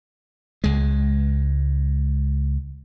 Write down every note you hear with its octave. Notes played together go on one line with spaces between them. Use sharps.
C#2 G#3